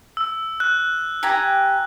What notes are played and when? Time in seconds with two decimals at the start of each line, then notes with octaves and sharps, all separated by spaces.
0.17 E6
0.60 F#6
1.23 G4 G#5 A#5